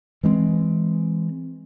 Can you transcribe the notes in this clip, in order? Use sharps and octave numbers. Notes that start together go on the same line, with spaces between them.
E3 G#3 B3 C4